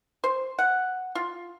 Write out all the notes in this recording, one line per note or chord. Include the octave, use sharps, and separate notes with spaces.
C5
F#5
F4